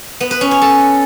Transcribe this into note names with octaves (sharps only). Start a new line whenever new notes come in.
B3
B4
C#4
C#5
A4